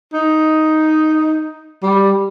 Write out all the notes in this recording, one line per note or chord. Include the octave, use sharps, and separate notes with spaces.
D#4
G3